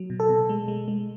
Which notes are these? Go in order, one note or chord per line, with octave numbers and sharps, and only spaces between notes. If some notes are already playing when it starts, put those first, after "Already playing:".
Already playing: F#3
B2
A4
B2
G#3
G#3
G#3